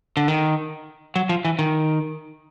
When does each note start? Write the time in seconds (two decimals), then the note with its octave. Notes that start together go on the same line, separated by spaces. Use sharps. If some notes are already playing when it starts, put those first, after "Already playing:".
0.17 D3
0.28 D#3
1.16 F#3
1.29 F3
1.45 E3
1.59 D#3